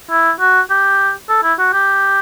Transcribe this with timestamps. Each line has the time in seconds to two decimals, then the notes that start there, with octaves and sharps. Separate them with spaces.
0.11 E4
0.40 F#4
0.70 G4
1.29 A4
1.43 E4
1.59 F#4
1.73 G4